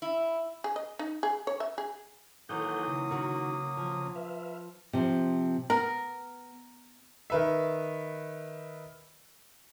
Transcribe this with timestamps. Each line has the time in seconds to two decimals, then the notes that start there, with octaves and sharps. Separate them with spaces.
0.02 E4
0.64 G#4
0.76 D#5
0.99 D#4
1.23 G#4
1.47 C#5
1.60 E5
1.78 G#4
2.49 D#3 E3 F#3 A#3 A4 F#5 D#6 G6
2.88 C#3
3.11 D#3 F#4
3.77 F3
4.15 B4 E5 F5
4.93 C3 F3
5.70 B3 A#4
7.30 D#3 B4 E5